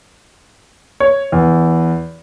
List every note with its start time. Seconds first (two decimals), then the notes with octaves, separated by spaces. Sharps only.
1.00 C#5
1.32 E2